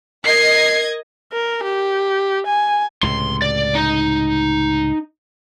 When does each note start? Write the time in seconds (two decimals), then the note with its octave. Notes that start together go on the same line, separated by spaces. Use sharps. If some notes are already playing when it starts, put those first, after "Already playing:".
0.24 A#4 D#5 G#6 C7
1.32 A#4
1.64 G4
2.47 G#5
3.03 C#2 A2 C3 C6
3.42 D5
3.75 D#4